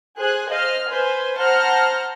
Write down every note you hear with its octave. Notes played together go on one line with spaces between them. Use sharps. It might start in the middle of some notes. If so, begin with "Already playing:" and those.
G#4 C5 G#5 F#6
C5 D#5 F5 F6
B4 C5 G#5
C5 F#5 A5 A#5 F6